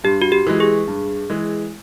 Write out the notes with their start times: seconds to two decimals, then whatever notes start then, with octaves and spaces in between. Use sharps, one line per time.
0.04 G2 G4
0.22 F#4
0.32 G4
0.47 E3 G#3
0.60 G#4
0.88 G2
1.30 E3 G#3